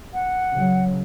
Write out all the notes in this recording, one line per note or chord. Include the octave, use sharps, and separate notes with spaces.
F#5
C#3 F#3